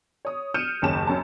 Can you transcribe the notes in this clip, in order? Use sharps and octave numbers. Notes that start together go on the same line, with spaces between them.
C#5 D#6
F6 G6 C#7 D#7 E7
F#1 D#2 C#4 A5 E7
F#2 C#4 A5